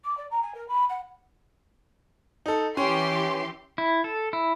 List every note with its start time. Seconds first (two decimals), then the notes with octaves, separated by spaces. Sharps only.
0.05 D6
0.17 D5
0.31 A#5
0.43 G#5
0.55 A#4
0.68 B5
0.89 F#5
2.46 D#4 A4
2.77 E3 C#4 G4 C6
3.78 E4
4.04 A4
4.33 E4